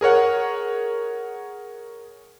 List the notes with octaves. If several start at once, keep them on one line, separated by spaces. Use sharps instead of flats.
G#4 A#4 C#5 F#5